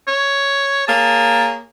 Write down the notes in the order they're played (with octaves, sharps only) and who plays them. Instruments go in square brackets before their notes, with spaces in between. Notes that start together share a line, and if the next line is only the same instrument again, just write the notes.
[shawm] C#5
[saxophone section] A#3 G#4 C#5 [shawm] A5